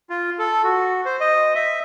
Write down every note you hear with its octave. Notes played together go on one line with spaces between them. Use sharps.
F4
A4
F#4
C5
D#5
E5